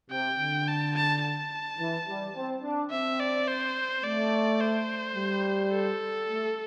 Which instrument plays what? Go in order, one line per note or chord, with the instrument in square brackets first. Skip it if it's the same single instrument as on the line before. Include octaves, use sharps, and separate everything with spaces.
[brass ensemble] C3 [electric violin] G5
[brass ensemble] D3
[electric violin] A5
A5
A5
[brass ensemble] E3
G3
C4
D4
[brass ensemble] C4 [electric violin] E5
[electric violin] D5
C5
[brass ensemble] A3 [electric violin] D5
[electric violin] C5
[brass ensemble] G3
[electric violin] A4
[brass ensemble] A3